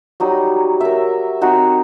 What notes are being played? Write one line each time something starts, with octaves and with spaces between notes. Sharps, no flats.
F#3 G3 D#4 D#6
A#4 E5
C4 D#4 F#4